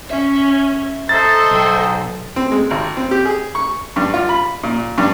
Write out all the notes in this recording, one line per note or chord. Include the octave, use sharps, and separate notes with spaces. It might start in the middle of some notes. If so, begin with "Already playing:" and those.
C#4 E5
A4 C5 D#5 E5 A#5 A6
B1 G5
C4
G#3
G#1
C4
G4
G#4
C#6
G2
F4
B5
A#2
G2